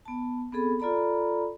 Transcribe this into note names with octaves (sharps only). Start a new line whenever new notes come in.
B3 A5
B3 C4 G#4 A4 B5
F4 A4 D5 A#5 B5